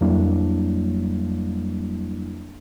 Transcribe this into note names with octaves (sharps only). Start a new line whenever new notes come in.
F2 F#3 G3 A#3 D4 E4